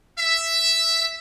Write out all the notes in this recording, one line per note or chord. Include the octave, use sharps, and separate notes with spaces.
E5